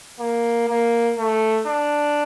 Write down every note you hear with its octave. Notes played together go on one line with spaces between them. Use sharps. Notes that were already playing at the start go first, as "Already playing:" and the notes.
A#3
A#3
A3
D4